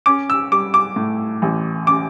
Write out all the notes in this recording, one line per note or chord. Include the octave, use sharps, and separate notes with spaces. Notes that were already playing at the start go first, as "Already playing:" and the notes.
C#4 D6
E6
G3 D6
D6
A2
A1
C#4 D6